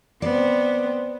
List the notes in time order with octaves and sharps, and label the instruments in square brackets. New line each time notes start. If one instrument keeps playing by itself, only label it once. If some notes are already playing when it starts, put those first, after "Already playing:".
[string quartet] B3 C4 [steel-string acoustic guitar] D5